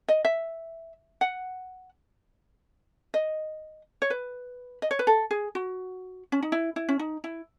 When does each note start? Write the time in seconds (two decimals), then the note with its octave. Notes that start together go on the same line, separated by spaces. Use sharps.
0.08 D#5
0.25 E5
1.21 F#5
3.14 D#5
4.02 C#5
4.10 B4
4.82 D#5
4.91 C#5
4.99 B4
5.07 A4
5.31 G#4
5.55 F#4
6.32 C#4
6.42 D#4
6.52 E4
6.76 E4
6.89 C#4
6.99 D#4
7.24 E4